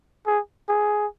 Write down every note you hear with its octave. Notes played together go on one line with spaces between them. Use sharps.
G#4
G#4